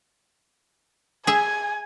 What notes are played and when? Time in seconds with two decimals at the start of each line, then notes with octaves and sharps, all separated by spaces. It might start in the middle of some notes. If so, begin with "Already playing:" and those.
1.27 G#4 E5 G#5